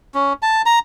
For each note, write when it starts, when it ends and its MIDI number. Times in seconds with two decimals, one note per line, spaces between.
0.14 0.33 61
0.42 0.62 81
0.66 0.79 82